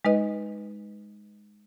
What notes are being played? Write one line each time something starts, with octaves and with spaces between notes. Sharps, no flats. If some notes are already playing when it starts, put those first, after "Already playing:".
G#3 D#4 B4 D#5